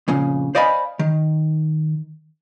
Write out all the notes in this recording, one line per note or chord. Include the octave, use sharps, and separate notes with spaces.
F2 A#2 C#3
C5 D5 D#5 F5 G#5 B5
D#3